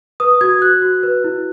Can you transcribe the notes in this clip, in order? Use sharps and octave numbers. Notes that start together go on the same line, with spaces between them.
B4 D#6
F#4 G#6
F#4 F#6
F#4
B4
E4